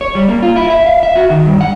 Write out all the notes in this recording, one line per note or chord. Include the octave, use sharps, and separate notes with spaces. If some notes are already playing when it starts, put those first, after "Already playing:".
C#5
G3
A#3
F4
E4
E5
F5
E5
F#4
D#3
G2
F#5